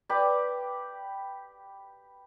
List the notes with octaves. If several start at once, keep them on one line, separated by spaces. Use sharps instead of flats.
G4 B4 D5